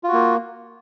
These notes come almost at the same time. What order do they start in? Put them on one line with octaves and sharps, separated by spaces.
F4 F#4 A#3